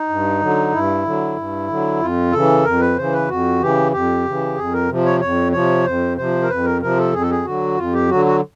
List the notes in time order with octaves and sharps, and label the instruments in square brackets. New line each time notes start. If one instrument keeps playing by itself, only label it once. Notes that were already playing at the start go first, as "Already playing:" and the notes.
Already playing: [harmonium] D#4
G2
D3 F#3
G2 E4
D3 F#3
G2
D3 F#3
F2 F4
C#3 E3 A4
F2 A#4
B4
C#3 E3 C5
B4
F2 F#4
C#3 E3 G4
F2 G4
C#3 E3
F2 G#4
A#4
C3 F3
C#5
F2 C#5
C3 F3 C#5
F2 C5
C3 F3 C5
A#4
F2 B4
A#4
C3 F3 A#4
A4
F2 G#4
A4
G#4
D3 F#3 F#4
F2 F4
G4
D3 F#3 F#4
F#4